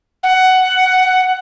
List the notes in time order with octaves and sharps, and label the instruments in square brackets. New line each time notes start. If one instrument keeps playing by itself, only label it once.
[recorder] F#5